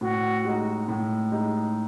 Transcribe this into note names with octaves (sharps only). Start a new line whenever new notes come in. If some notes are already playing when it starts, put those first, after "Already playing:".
A2 F#4
G#3 D#4
A2
G#3 D#4